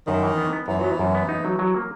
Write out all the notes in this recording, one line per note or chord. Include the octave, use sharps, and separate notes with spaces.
F#2 D#3
E3
B3
B3
F#2 E3
F#3 B3
E3
F#2
B3
D#4
F#3
F#3
A#3